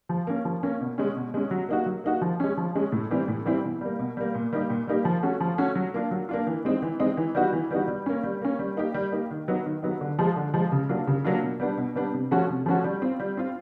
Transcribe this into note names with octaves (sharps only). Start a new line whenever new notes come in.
F3
A#3 C#4
F3
A#3 C#4
B2
G#3 C#4
B2
G#3 C#4
F#3
A#3 D#4 F#4
F#3
A#3 D#4 F#4
F3
G#3 C#4
F3
G#3 C#4
A2
E3 G3 C4 E4
A2
E3 G3 C4 E4
B2
G3 A#3
B2
G3 A#3
A#2
G3 A#3 D#4 G4
A#2
G3 A#3 D#4 G4
F3
A3 C#4 F#4
F3
A3 C#4 F#4
F#3
A#3 D4 F4
F#3
A#3 D4 F4
E3
G#3 C4 D#4
E3
G#3 C4 D#4
E3
G3 B3 D#4 F#4
E3
G3 B3 D#4 F#4
G3
A#3 C#4
G3
A#3 C#4
G3
A#3 D#4 G4
G3
A#3 D#4 G4
D#3
F#3 B3 D#4
D#3
F#3 B3 D#4
D3
F3 G#3
D3
F3 G#3
C#3
F#3 A#3 D4 F4
C#3
F#3 A#3 D4 F4
B2
G3 B3 D4
B2
G3 B3 D4
C3
F3 A3 C#4 F#4
C3
F3 A3 C#4 F#4
G3
C4 F4
G3
C4 F4